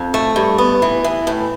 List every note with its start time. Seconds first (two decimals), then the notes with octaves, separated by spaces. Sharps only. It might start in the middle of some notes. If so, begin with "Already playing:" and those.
Already playing: F2
0.14 A3
0.36 G2
0.58 B3
0.82 E3
1.04 E3
1.27 A2